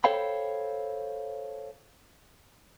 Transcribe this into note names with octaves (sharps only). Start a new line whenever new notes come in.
A4 C5 C#5 F5 G5 B5